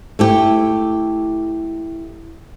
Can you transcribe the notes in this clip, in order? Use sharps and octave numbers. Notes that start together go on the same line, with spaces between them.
A3 E4 G4